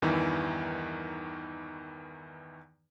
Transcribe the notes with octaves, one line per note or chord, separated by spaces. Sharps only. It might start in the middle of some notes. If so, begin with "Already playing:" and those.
E2 G2 D#3 E3